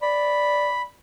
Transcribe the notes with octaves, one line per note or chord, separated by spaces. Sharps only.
D5 B5